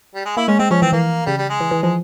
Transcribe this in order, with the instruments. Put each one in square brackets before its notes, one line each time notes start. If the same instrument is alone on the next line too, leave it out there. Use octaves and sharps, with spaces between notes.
[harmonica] G3
G#3
[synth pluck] A#3 [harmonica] E4
[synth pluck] G#3 [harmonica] C#4
[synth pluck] G#3 [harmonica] C4
[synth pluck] F3 [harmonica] C#4
[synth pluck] E3 [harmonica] C4
[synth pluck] E3 [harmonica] A#3
[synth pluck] C#3 [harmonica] G3
[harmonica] G3
G#3
[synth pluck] E3
E3
[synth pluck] F3 [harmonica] G#3